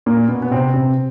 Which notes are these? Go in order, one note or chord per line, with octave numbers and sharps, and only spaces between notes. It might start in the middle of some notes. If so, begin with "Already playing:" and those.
A#2 A#3
B2 B3
B3
C3 C4
C3 C4